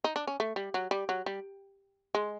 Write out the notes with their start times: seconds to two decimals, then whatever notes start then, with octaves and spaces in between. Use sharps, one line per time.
0.04 D#4
0.16 D4
0.27 C#4
0.40 A3
0.56 G3
0.74 F#3
0.91 G3
1.09 F#3
1.26 G3
2.15 G#3